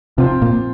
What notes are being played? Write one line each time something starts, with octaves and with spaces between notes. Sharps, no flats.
C3 F3 C4 F4
A#2